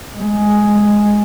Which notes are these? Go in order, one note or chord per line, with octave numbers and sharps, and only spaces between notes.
G#3